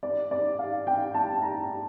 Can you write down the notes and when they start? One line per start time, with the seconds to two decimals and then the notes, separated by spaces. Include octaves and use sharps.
0.03 D5
0.31 D5
0.59 F5
0.87 G5
1.14 A5
1.42 A#5